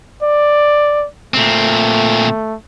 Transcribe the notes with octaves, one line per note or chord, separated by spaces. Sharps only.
D5
A#2 A3 C4